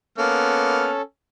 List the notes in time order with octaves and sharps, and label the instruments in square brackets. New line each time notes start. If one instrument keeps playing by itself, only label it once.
[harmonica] A#3 B3 F6 [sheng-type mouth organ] C#4 A4